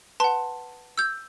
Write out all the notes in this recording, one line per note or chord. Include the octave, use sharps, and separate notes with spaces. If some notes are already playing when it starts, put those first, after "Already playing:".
B4 F#5 A5 C6
E6 G6